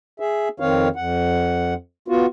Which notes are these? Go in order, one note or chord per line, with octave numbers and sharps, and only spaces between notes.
G#4 E5
F2 D#3 C4 C#5 F5
F2 F#5
B3 F4 F#4